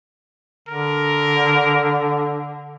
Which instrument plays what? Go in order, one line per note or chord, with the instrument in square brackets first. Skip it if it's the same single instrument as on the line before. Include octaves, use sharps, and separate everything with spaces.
[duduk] D3 [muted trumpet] A#4